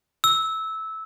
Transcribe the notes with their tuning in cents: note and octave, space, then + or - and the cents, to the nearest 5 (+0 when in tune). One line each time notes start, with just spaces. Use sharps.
E6 -15